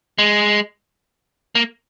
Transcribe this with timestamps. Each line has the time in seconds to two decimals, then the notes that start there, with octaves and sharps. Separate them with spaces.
0.18 G#3
1.55 A#3